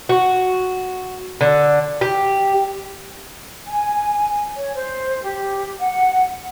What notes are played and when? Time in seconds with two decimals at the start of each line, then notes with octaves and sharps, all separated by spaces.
0.09 F#4
1.41 D3
2.01 G4
3.66 G#5
4.56 C#5
4.74 C5
5.23 G4
5.78 F#5